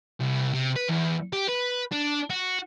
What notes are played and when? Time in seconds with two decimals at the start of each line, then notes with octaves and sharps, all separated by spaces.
0.20 C2
0.53 C3
0.76 B4
0.89 E2
1.33 G4
1.48 B4
1.92 D4
2.30 F#4